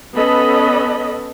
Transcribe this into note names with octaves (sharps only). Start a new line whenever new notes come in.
B3 C#4 A4 D#5 B5